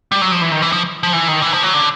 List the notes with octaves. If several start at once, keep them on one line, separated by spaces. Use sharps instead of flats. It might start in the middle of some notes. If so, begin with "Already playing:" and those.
G3
F#3
F3
E3
D#3
E3
F3
F3
E3
D#3
E3
F3
F#3
D3